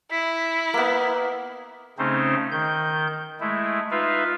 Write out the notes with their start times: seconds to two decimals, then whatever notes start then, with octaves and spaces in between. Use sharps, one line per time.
0.11 E4 B6
0.74 A#3 B3
1.98 C#3 A3 C4 C#4 D#4 C5
2.52 D#3 G6
3.40 G#3 A3 E4
3.91 D#4 F4 B4 E5 F5